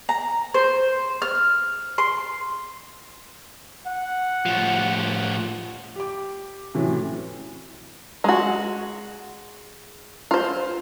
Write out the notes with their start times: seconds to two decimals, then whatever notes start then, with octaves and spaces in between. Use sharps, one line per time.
0.09 A#5
0.54 C5
1.22 F6
1.98 C6
3.87 F#5
4.46 A2 F3
5.95 G4 D6
6.74 A2 C3 E3 F#3 C#4 E4
8.24 G#3 F#4
10.31 F4 C5